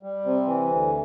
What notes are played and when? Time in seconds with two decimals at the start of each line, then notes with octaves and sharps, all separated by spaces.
0.03 G3
0.25 C3
0.47 E3
0.70 D2